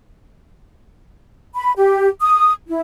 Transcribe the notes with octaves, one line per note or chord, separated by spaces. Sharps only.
B5
G4
D#6
E4